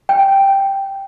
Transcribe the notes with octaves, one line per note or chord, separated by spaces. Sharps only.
G5